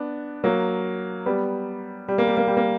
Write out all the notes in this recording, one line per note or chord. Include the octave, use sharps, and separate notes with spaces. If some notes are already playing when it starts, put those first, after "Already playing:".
Already playing: B3 D4
F#3 A#3
G3 B3
G3
A#3
G3
A#3
G3
A#3